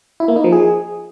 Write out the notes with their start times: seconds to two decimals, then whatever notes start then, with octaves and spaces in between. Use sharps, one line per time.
0.20 E4
0.28 A#3
0.36 D#4
0.44 F3
0.52 G#4